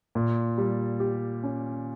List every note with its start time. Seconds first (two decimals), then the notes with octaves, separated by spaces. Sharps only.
0.15 A#2
0.58 G3
1.00 G4
1.43 C#4